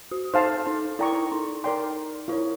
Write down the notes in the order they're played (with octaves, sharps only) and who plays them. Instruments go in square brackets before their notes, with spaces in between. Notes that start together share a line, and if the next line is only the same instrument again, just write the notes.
[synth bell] F#4
[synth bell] D#4 [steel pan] C5 F5 A5
[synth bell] D#4
[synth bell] E4 [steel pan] A#4 D5 G5 A#5 C#6
[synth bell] D#4
[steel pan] A#4 D5 G5 C6
[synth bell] E4 [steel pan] F4 A#4 C#5